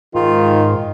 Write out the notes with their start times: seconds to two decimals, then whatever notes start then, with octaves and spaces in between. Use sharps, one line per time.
0.15 G#2 D#3 F4